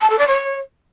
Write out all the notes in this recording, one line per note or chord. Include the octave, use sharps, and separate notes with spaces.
A5
A4
D5
C#5